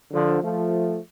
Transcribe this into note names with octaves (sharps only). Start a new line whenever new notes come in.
D3 F3
F3 A3